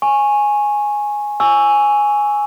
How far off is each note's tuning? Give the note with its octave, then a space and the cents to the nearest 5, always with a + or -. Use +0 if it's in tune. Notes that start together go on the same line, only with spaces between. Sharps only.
G#5 +0 C#6 -15
G#5 +0 C#6 +15 E6 +0